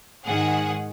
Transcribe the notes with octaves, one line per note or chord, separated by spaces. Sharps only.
G#2 D#3 G#4 F#5